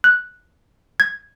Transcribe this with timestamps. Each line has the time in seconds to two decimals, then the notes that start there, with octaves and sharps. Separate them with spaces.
0.04 F#6
1.00 G#6